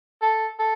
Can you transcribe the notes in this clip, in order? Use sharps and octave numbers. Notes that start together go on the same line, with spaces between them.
A4
A4